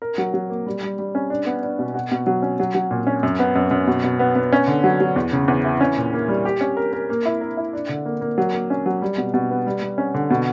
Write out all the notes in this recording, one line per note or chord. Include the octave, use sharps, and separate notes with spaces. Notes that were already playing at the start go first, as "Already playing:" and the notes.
A#4
F#3
F#3
A#3
G3
G3
G3
C#4
D4
B3
D4
B2
F#4
B2
F#3
C#4
F#3
F#3
A#2
C#4
F#2
B3
F#2
F#2
B2
B2
B3
B3
C#4
D3
F#3
F#3
E2
C#3
E2
E3
C#4
A#2
A#3
G3
G4
C#4
A#4
A#4
A#3
E4
A#4
E4
D4
D3
A#3
A#3
F#3
A#3
C#4
F#3
G3
B2
B2
B3
G3
G3
C#4
D3
B2